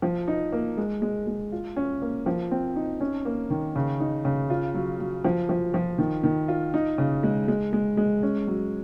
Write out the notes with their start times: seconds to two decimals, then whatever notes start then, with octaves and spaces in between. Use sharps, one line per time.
0.02 F3
0.28 D#4
0.52 A#3
0.77 G#3
1.02 G#3
1.27 G#3
1.52 F4
1.76 C#4
2.02 A#3
2.26 F3
2.51 C4
2.76 D#4
3.01 C#4
3.25 A#3
3.50 D#3
3.76 C#3
4.00 D#4
4.25 C#3
4.50 F4
4.74 F#3
5.00 F#3
5.24 F3
5.49 F3
5.74 F3
5.98 D#3
6.23 D#3
6.48 F4
6.74 D#4
6.98 C#3
7.23 G#3
7.48 G#3
7.73 G#3
7.97 G#3
8.23 C#4
8.47 F#3